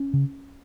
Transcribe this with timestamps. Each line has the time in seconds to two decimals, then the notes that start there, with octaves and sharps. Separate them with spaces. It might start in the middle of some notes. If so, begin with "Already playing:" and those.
Already playing: C#4
0.13 C#3